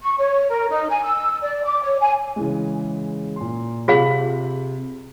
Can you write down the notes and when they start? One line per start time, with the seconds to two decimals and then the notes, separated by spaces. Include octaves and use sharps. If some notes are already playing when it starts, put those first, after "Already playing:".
0.02 C#6
0.18 C#5
0.49 A#4
0.70 D#4
0.90 G#5
1.03 E6
1.42 D5
1.65 D6
1.82 C#5
2.01 G#5
2.36 C#3 E3 G#3
3.36 A#2 C6
3.88 C3 F4 G#4 F5 B5 F#7